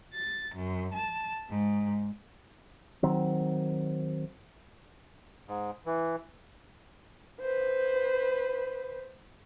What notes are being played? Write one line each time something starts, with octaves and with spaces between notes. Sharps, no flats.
A6
F#2
A5
G#2
D#3 F#3 C4
G#2
E3
B4 C5